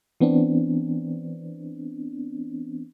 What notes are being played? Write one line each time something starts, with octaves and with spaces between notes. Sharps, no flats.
E3 B3 C4 D4